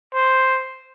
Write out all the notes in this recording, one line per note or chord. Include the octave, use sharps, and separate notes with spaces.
C5